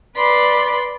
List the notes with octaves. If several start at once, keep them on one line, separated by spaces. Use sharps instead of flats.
B4 D5 B5 C6